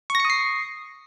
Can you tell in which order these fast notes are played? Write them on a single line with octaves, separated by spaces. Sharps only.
C#6 A#6 C#7 D#6 C7